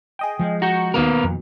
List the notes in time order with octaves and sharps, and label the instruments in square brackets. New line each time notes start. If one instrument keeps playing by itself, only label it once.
[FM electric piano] G#4 D#5 G5
[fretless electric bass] F3 G#3
[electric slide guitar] F#4 [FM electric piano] A#5 C#6 G6
[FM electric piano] D#2 B2 [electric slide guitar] B3 A#4
[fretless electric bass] F2